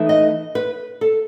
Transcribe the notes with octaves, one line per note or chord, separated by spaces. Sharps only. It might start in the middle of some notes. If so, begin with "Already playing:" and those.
Already playing: E3 A3 D#4
D#5
B4
A4